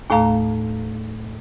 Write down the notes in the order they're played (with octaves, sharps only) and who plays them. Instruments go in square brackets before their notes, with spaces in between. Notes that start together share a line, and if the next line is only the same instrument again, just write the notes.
[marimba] D#2 A2 A3 F5 A#5